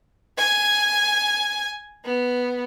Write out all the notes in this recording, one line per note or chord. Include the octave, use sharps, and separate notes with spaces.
G#5
B3